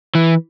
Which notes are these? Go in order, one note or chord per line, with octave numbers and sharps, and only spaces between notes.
E3